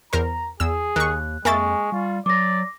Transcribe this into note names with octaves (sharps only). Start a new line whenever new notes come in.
E2 A#4 C5 A#5
E2 G#4 E6
D#2 D#3 C#6 F#6
F2 G#3 A#3 E5 G#5 C#6 A6
G3 F4
F#3 D5 D6 A#6